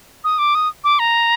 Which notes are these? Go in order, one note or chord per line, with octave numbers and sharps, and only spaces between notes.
D#6
D6
D#6
D6
A#5